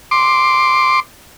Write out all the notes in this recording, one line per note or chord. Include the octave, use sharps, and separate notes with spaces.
C6 D6